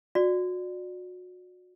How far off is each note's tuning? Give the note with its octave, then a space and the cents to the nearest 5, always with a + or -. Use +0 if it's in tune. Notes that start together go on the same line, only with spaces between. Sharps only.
F#4 -30 D5 +15